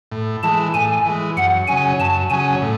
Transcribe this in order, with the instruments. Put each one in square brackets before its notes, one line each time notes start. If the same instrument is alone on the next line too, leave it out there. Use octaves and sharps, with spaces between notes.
[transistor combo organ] A2
[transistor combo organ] E3 G#3 [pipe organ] A5
[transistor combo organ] A2 [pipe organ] G#5
[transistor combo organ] E3 G#3
[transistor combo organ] F#2 [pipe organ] F#5
[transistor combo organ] C#3 F#3 C#4 [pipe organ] G#5
[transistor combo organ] F#2 [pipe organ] A5
[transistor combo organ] C#3 F#3 C#4 [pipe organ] G#5
[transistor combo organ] A2